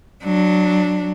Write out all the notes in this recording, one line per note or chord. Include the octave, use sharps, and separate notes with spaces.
F#3 D4